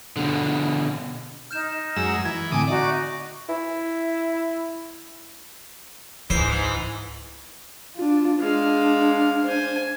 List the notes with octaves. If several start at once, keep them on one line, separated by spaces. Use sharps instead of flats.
B2 D3
D#4 F6 G6 E7
F#2 G#3 F#5 E6
E3 G#6
A2 D3 C4 G#5 D6 D#6
D#4 F#4 D5 E5
E4
C#2 G#2 E3 C5
D4 F4
G#3 D4 F5
C5 G#5